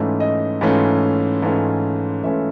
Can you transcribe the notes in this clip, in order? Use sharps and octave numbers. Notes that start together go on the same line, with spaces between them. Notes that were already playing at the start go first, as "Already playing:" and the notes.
Already playing: G#2 E3 A3 C#4 F4 E5
D#5
G#2 E3 A3 C#4 F4
G#2 E3 A3 C#4 F4
G#2 E3 A3 C#4 F4 E5